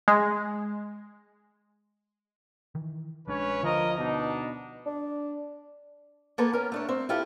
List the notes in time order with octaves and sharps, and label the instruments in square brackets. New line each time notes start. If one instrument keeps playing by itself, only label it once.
[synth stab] G#3
[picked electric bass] D#3 E3
[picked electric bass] A#1 G#3 D4 [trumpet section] C#4 B4 C#5
[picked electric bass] D2 D3 [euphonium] F3 [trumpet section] A#4 D#5
[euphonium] B2 [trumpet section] D4 D#4
[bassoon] D4
[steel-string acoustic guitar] A#3 B3 A4 B4 A5
C#4 A#4
A3 D4 C#5
C4
E4 F4 G4 A4